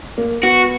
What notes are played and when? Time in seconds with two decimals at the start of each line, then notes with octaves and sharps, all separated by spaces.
0.18 A#3
0.43 B3 F#4